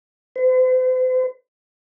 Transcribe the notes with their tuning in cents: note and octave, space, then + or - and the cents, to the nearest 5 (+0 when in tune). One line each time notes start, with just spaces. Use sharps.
C5 -40